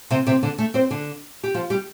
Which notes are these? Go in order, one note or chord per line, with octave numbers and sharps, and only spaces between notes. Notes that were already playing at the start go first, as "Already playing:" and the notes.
C3 C4
C3 C4
D3 D4
A3 A4
C4 C5
D3 D4
G4
F3 F4
G3 G4